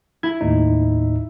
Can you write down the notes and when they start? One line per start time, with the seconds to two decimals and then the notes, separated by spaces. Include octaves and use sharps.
0.23 E4 G#6
0.41 D#2 A2 D#4